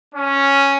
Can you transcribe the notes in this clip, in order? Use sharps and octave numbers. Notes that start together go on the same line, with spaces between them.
C#4